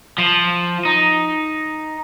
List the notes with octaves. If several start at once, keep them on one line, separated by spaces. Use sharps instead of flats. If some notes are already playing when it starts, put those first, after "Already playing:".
F3
D#4